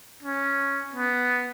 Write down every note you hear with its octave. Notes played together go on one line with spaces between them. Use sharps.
C#4
B3